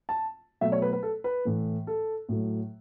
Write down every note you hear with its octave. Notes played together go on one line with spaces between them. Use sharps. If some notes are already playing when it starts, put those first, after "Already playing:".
A5
B2 F#3 A3 E5
C#5
B4
B4
A4
B4
A2 E3 A3
A4
A2 F#3 A3